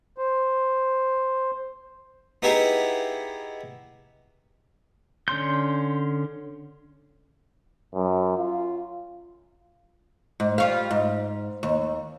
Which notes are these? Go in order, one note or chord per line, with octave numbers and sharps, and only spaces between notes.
C5
B3 D#4 E4 G4 G#4 A#5
D3 C#4 C6 G6
F#2
F4
G#2
G3 F4 F5
G#2
D#2